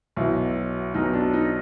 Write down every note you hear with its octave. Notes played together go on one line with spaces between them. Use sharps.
B1 B2 E4
B1 B2 D#4
D4
D#4